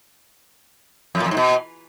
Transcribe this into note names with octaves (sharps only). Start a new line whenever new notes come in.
F2
A#2
F2
G#2
B2